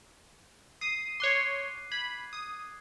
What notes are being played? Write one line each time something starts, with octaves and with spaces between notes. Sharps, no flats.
D#6 C7 D#7
C#5 C6 D6 F#6 C7
B5 G#6
D#6